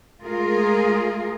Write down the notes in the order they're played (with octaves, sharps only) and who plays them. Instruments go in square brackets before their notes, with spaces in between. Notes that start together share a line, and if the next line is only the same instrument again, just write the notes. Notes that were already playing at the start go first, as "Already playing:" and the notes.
[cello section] G#3 A3 F4 G#4 A#4